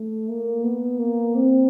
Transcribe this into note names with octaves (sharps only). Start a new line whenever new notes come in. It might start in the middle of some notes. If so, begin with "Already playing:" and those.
Already playing: A3
A#3
B3
A#3
C4